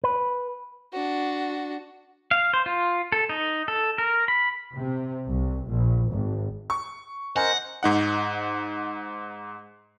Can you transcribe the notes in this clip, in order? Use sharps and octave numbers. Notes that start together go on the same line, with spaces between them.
B4
D4 F#4
F5
C5
F4
A4
D#4
A4
A#4
B5
C3
C2
A#1
G#1
C#6
A#4 C5 D#5 F#5 G#5
G#2 D#4 F#5